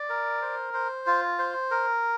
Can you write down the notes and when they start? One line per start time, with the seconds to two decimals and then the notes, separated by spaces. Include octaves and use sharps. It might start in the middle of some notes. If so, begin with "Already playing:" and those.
Already playing: D5
0.09 A#4
0.42 C5
0.74 C5
1.07 F4
1.39 C5
1.71 A#4